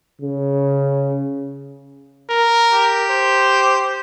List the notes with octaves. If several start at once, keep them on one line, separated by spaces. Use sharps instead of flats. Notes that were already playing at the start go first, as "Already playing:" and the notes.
C#3
A#4
G4
C5